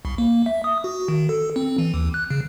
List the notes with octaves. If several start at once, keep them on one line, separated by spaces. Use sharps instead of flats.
C2
A#3
E5
D#6
F#4
D#3
A4
C4
E3
D#2
F#6
C#3